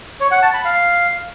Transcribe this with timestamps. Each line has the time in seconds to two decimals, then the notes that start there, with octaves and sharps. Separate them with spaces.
0.20 C#5
0.31 F#5
0.42 A5
0.54 B5
0.65 F5